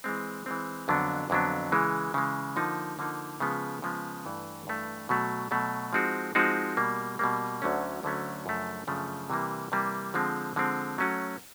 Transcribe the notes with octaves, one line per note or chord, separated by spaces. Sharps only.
E3 G#3 C4
E3 G#3 C4
F2 D3 F#3 B3 D4
F2 D3 F#3 B3 D4
C#3 E3 G#3
C#3 E3 G#3
D3 F3 A#3 D#4
D3 F3 A#3 D#4
C#3 F3 G#3 B3
C#3 F3 G#3 B3
G2 E3 A3
G2 E3 A3
B2 F#3 A3
B2 F#3 A3
F3 G#3 C4 D#4 F#4
F3 G#3 C4 D#4 F#4
B2 G3 A#3
B2 G3 A#3
D2 D3 F#3 A3 C#4
D2 D3 F#3 A3 C#4
F#2 C#3 F3 A3 D4
F#2 C#3 F3 A3 D4
C3 E3 G3 A#3
C3 E3 G3 A#3
D3 F3 G#3 C4
D3 F3 G#3 C4
F#3 A3 C#4 F#4